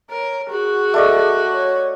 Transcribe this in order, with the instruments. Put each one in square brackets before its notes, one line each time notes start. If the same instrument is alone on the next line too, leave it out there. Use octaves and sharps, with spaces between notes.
[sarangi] A#4 [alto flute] C#5
[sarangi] F#4 [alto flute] G#4
[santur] A3 D5 D#5
[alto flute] C#5